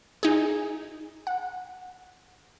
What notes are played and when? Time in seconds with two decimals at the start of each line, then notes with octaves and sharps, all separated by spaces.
0.23 D#4 G#4
1.27 F#5